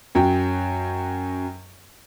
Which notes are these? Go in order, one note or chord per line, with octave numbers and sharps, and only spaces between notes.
F#2 F#3 G5